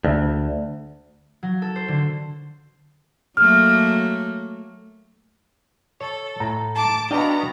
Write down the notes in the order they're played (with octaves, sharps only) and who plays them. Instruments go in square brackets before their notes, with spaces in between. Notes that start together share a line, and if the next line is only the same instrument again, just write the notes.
[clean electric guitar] D2
[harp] F#3
A4
C5
D3
[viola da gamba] F#3 A3 A#3 [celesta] F6
[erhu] A4 [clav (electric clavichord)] C#5
[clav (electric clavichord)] A2 [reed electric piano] A#5
[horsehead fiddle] A5 [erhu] D6
[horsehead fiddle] B3 F#4 [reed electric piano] D4 [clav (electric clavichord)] D#5 F5 G5 [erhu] A#5